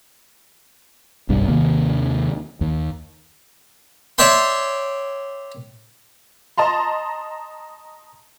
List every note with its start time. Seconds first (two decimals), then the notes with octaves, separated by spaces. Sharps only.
1.29 F#1 B1 G2 G3
1.48 D#2 C3 D#3 A#3
2.61 D#2
4.18 C#5 D5 E5 G5 C6
6.58 D#5 A5 A#5 C6